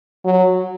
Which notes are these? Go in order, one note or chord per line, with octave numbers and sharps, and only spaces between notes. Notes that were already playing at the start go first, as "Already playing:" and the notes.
F#3